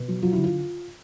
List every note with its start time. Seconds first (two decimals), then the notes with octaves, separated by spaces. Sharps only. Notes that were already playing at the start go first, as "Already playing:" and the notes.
Already playing: B2
0.08 F#3
0.22 F#3 F4
0.33 D3 E4
0.44 F4